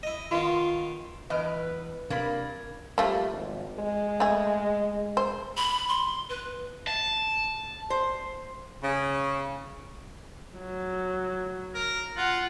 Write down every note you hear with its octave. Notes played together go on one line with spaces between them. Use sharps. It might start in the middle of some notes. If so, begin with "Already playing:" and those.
E4 D#5
D#3 B3 F4
E2 B4 D#5 F6 D7
C3 A#3 D4 A#4 B5 G#6 A6
F3 G3 A3 A#3
G#1
G#3
A3 G#4
C5
B5
C6
B4
A5
C5
C#3
F#3
A#4
F4 F#5